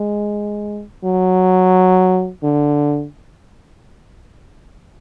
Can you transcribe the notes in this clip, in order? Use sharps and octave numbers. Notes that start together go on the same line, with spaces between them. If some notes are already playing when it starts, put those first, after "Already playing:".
Already playing: G#3
F#3
D3